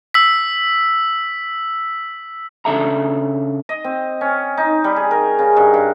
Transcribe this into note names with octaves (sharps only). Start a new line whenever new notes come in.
E6 B6
C#3 D4 A4 E5 A#5
D#5
C4
C#4
D#4
G3
G#4
A#4
C#3
G2
G2